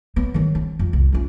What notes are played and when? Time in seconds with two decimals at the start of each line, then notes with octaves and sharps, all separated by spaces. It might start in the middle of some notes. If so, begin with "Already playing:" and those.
0.16 F#3 B3
0.34 D#3 F#3
0.55 C4
0.79 F2
0.93 C2
1.12 C#4 F4